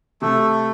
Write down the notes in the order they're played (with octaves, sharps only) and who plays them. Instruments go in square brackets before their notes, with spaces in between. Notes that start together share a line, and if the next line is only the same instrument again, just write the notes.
[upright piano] C3 [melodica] A3